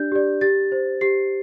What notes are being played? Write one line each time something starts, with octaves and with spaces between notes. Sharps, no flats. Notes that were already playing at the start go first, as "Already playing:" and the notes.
Already playing: D4 G4 D5 G6
G4 D5
G4 A6
C5
G4 C7